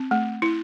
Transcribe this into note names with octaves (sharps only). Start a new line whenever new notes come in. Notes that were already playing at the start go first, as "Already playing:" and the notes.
Already playing: C4
A3
E4